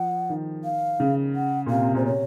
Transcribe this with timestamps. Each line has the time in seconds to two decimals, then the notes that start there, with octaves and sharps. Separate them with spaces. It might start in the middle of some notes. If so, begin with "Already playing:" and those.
Already playing: F3 F#5
0.30 D#3
0.64 F5
1.00 C#3
1.35 F#5
1.66 A#2
1.70 C3 F5
1.82 C3
1.94 A#2 C5
2.06 C3 C#5